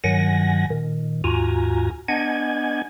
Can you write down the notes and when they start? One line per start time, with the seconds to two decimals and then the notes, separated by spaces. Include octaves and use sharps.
0.04 G2 D#3 F#3 F#5 G#5 A#6
0.70 A#2 D#3
1.24 D#2 G#2 F4 F#4 G#5 A#5
2.08 B3 D4 D#5 F#5 G#5 G#6